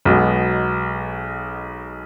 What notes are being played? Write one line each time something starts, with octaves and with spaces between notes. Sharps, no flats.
B1 B2 G#3